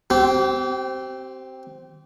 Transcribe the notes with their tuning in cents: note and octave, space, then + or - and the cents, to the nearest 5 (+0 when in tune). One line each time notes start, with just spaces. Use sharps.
C4 +0 G4 -35